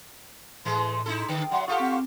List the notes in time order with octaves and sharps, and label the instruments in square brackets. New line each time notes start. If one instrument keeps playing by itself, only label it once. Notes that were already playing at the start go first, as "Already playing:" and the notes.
[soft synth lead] A2 [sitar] E3 G#3 A3 [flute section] C6
[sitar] D#4 E4 A4
[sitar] D3 [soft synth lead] G5
[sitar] F#3 [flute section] E5 F#5 C6
[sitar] F4 G4 A4 [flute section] F5 F#5 C#6 [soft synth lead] D#6
[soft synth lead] C4